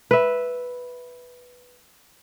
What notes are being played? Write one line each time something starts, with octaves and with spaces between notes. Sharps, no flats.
B4 E5